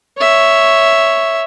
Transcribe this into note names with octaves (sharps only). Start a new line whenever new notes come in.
C#5 E5